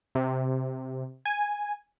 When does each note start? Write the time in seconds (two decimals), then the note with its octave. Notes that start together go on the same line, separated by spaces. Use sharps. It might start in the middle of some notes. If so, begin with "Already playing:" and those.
0.15 C3
1.25 G#5